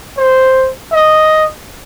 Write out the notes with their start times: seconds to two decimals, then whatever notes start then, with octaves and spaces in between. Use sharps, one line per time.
0.17 C5
0.93 D#5